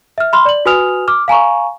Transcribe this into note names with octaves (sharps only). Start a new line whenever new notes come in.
E5 F6
B5 C6 F6
D5 F#7
F#4 B4 G#5 D#6 F6 F7
D6 F6
F5 G#5 A#5 C#6